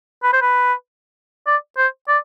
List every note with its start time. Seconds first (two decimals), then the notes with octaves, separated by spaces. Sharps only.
0.23 B4
0.33 C5
0.42 B4
1.47 D5
1.78 C5
2.08 D5